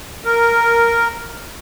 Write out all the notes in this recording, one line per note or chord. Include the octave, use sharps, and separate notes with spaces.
A#4